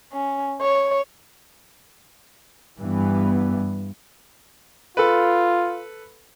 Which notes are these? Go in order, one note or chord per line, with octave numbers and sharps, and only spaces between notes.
C#4
C#5
G2 E3 B3
F4 A4 B4